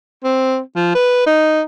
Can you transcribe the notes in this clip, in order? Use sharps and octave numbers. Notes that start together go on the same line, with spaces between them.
C4
F3
B4
D#4